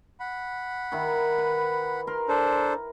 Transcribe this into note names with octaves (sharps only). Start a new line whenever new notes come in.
F#5 B5
D#3 E4
B4
A#4 C6
D4 A4 C5